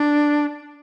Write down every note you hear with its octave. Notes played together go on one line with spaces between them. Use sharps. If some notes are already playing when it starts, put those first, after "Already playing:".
Already playing: D4